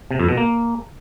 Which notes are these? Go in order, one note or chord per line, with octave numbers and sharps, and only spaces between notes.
C3
F2
B2
A#3